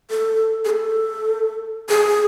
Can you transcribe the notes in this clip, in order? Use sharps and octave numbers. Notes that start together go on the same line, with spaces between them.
A4
G#4
A4
G#4